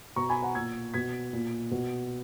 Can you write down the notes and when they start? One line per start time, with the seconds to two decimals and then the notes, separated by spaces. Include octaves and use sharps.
0.16 B2 A#5 C#6
0.29 G#5 B5
0.43 F#5 A#5
0.55 A#2 E6 G#6
0.94 B2 G#6 B6
1.33 A#2
1.71 B2